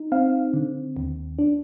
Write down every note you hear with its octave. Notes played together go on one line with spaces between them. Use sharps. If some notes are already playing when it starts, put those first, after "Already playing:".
Already playing: D#4
C4 F5
D3
D#2
D4